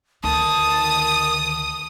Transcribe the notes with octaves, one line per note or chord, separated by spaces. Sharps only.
D2 D#3 A5 D#6